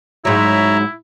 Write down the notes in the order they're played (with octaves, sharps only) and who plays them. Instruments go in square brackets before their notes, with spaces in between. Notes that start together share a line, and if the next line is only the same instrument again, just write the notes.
[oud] G#2 F#3 [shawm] E4 [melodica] C#5 E5 A#5